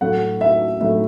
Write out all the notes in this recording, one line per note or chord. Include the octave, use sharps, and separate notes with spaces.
A2 F#3 A3 F#5
E5
A2 F#3 A3 E5